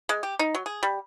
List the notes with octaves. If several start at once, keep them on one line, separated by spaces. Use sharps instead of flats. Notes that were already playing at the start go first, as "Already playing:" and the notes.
G#3
G4
D#4
F#3
G#4
G3